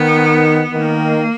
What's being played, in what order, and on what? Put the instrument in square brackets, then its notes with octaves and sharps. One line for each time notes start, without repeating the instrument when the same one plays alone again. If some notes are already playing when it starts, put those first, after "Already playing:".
Already playing: [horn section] D#3 [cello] B3
[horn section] D#3 [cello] A#3